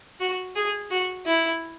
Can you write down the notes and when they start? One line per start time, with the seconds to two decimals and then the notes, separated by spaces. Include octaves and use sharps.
0.20 F#4
0.55 G#4
0.91 F#4
1.26 E4